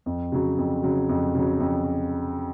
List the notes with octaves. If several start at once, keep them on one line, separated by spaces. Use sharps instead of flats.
F2
C#3 F#3
F2
C#3 F#3
F2
C#3 F#3
F2